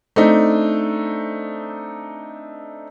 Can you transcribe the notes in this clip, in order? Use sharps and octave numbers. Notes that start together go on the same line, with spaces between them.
A3 C4 D4 D#4